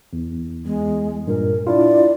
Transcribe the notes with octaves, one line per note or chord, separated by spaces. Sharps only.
E2
E2 G#3
G2 A#2 A#4
D4 E4 F4 D5